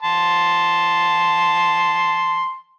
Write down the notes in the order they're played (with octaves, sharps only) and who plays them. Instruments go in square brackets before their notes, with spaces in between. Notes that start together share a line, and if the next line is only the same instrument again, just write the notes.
[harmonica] A5 C6